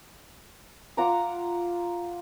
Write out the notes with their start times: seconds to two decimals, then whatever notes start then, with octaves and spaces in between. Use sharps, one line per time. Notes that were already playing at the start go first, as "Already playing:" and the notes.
0.97 F4 F#5 A#5 D6